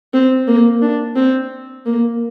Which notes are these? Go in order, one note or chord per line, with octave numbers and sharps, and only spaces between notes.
C4
A#3
D4
C4
A#3